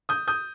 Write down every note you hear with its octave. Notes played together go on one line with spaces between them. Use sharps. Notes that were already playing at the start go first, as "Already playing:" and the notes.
D#6 G6
D#6 G6